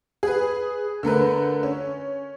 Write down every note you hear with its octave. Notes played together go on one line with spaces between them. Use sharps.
G#4 B4
D3 A3 A#4 B4
C#4